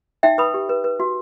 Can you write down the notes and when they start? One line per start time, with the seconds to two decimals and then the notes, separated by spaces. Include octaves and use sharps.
0.23 D#4 E5 G5
0.38 B4 B5 D#6
0.54 G4
0.69 B4
0.84 B4
1.00 F#4